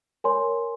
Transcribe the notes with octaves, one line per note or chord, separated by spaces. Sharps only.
A#4 C#5 G#5 C6